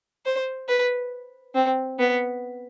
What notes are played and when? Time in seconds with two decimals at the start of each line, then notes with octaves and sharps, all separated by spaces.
0.25 C5
0.68 B4
1.55 C4
1.99 B3